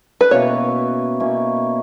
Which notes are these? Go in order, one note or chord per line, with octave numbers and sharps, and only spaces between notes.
B4
B2 A#3 C#4 E4 C#5
B2 A#3 C#4 E4